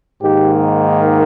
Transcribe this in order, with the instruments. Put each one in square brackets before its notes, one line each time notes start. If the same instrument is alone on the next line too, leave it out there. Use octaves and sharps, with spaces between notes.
[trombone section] G#2 D#3 A#3 G4